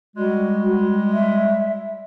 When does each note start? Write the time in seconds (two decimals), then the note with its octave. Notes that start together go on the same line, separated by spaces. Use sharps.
0.17 G3 G#3 F#4
1.12 E5